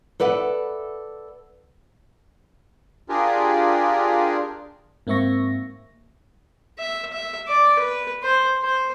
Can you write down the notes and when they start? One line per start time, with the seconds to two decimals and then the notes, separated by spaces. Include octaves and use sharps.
0.20 A4 B4 D5 E5 F#5
3.09 D4 F4 G4 G#4 A#4
5.07 G#2 A#3 C4 E5 C#6 A#6
6.79 E5
7.13 E5
7.48 D5
7.79 B4
8.23 C5
8.62 C5